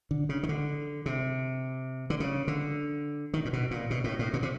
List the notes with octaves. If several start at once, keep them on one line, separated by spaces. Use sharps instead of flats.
D3
C#3
D#3
D3
C3
D3
C#3
D3
D#3
A#2
B2
A#2
B2
A2
A2
A#2
C3